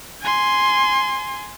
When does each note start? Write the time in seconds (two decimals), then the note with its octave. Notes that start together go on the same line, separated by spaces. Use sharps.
0.22 G#5 C6